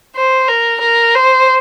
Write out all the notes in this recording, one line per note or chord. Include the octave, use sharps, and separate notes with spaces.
C5
A#4
A#4
C5